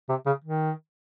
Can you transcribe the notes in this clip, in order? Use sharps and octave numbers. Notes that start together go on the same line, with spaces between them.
C3
C#3
D#3